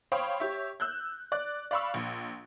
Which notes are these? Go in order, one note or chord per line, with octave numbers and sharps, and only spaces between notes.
C5 C#5 F5 G5 B5 D#6
G4 C#5 E5
E6 F#6 G6
D5 F#6
D5 F5 B5 C#6 E6
A#1